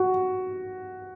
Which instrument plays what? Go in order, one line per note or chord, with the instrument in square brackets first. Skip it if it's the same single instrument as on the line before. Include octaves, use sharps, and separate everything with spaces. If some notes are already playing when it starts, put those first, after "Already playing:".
Already playing: [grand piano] F#4